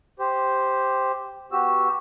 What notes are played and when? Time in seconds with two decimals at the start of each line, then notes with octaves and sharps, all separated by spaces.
0.19 G4 C5
1.52 B3 F#4 G4 E6